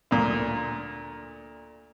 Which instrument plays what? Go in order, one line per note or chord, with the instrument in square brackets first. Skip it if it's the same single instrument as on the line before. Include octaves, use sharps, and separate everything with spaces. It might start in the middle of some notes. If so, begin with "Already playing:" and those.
[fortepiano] D2 A#2